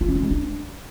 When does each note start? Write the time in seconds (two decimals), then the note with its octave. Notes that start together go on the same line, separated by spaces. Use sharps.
0.01 F4
0.08 C#4
0.16 F4
0.23 G#3
0.31 D4